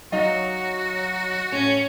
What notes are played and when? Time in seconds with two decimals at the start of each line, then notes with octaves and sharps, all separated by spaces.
0.12 F#3 D#4 F#4 D#5 F5
1.52 A2 C#4